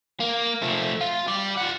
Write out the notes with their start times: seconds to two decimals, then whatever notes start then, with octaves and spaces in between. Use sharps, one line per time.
0.20 A#3
0.62 F3 A3
1.01 F4
1.28 G3 D5
1.58 F4 F#5